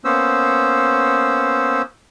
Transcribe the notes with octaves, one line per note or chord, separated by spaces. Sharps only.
A#3 B3 C#4 C5 E6